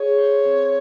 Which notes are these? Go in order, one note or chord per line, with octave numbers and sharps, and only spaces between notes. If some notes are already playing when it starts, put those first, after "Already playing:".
Already playing: G#4 C#5
C5
C4